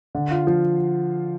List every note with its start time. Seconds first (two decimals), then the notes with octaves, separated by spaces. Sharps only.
0.15 D3
0.31 F4
0.47 F3